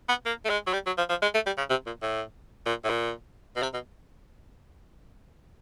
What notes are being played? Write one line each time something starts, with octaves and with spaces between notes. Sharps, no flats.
B3
A#3
A3
G#3
F#3
G3
F#3
F3
F3
G#3
A3
G3
C#3
C3
A#2
A2
A#2
A2
A#2
B2
C3
B2